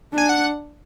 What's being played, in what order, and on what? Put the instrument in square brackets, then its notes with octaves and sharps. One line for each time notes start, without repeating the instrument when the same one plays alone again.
[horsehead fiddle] D4 [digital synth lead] G#5
[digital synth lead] F#5